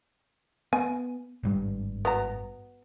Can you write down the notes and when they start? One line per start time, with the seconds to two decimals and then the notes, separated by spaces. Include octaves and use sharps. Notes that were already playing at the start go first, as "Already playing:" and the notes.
0.73 B3 G#5
1.43 G#1 G2 G3
2.05 B3 F#4 A#5